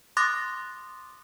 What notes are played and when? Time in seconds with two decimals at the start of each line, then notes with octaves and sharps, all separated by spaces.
0.17 C6 D6 D#6 F#6 A6 A#6